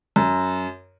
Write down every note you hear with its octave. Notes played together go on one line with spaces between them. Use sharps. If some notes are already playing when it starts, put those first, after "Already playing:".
F#2